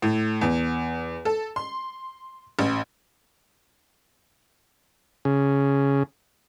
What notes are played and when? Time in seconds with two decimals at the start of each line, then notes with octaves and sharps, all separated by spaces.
0.02 A2
0.41 E2
1.25 A4
1.56 C6
2.59 A1
5.25 C#3